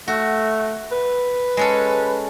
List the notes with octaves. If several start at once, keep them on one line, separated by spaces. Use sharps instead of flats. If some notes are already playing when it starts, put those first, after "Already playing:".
A3 F#4
B4
G#3 C#4 A4